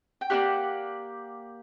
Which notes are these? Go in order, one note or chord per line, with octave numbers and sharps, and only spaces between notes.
G5
A#3 E4 G4 D5 F#5